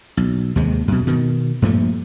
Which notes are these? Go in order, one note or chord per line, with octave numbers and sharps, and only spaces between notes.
B1
D#2 C3 G#3
F#2 B2
B2 D#3
G2 A#2 F3 A3